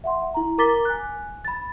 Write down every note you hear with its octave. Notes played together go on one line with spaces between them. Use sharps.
E5 F#5 C6
E4 A#5
A#4 A#5 D6 A6 B6 G7
G#5 F#6
B5 A6